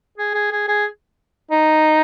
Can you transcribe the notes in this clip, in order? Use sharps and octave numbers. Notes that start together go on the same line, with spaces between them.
G#4
G#4
G#4
G#4
D#4